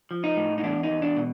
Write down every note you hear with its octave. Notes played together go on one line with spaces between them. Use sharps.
F3
D#4
A2
D#4
E2 D4
D#4
E2
D4
B2